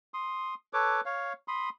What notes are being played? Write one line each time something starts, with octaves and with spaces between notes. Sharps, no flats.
C6 D#6
A4 B4 C#5 D6
C#5 F5
B5 C6 D#6